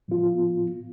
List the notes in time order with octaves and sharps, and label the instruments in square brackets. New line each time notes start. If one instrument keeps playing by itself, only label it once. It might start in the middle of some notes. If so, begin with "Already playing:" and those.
[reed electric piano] A2 F3 B3 F4